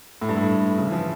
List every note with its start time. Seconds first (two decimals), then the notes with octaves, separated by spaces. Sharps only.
0.21 A2
0.29 G2
0.37 A2
0.78 C#3
0.86 E3
0.92 F3